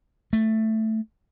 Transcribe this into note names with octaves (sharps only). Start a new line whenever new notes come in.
A3